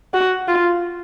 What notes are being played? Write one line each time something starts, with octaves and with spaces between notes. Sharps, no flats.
F#4
F4